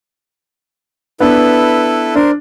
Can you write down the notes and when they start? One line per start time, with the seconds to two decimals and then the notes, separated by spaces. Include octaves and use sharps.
1.20 B3 D4 E4 A4 B4
2.15 D4 A#4 C5